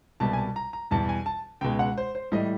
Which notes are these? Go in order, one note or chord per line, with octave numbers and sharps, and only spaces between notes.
C2 B2 G3 A5
G#5
A5
A#5
A#5
E2 B2 G3 A5
G#5
A5
C#2 B2 G#3 G5
F#5
C5
C5
A2 E3 G3 D#5